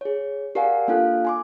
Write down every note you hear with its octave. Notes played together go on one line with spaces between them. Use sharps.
G#4 C#5
G4 A#4 D5 F5 F#5 G#5
A#3 D4 F4 A4 F5 F#6
G#5 C6 D6